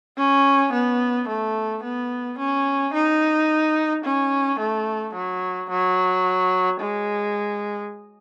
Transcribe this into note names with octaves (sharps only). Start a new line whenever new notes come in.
C#4
B3
A3
B3
C#4
D#4
C#4
A3
F#3
F#3
G#3